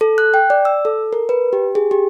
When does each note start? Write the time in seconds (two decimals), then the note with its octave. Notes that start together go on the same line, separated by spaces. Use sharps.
0.01 A4
0.18 F#6
0.34 G5
0.50 D5
0.65 E6
0.85 A4
1.13 A#4
1.29 B4
1.53 G4
1.75 G#4
1.91 G4